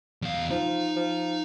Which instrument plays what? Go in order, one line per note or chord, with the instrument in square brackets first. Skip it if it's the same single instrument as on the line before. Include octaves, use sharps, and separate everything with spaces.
[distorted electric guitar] E2 F5
[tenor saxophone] F3 [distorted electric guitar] D#4
[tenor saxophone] F3